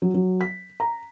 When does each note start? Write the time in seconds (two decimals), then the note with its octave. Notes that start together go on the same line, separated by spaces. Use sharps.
0.02 F#3
0.14 F#3
0.41 B6
0.80 A#5